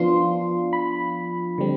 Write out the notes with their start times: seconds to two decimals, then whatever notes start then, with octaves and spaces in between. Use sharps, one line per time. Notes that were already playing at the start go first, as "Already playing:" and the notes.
Already playing: F3 B3 D4 F4 C6
0.73 B5
1.58 D3 G3 C4